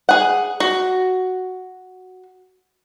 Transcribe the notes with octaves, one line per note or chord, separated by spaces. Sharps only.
G#4 F#5
F#4